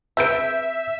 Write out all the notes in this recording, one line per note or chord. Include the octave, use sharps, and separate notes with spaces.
C4 G#4 B4 E5 E6 G6 D7